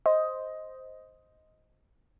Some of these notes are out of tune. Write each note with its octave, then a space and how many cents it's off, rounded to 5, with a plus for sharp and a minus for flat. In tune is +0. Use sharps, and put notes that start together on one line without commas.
C5 +0 D#5 +10